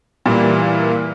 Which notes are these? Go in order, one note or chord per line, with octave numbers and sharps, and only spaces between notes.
A#2 E3 G3 A#3